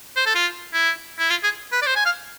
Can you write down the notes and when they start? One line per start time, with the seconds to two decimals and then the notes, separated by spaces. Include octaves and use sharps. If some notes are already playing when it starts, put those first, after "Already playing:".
0.16 C5
0.26 A4
0.35 F4
0.74 E4
1.19 E4
1.30 F4
1.44 G#4
1.72 B4
1.82 D5
1.87 C5
1.96 G#5
2.06 F5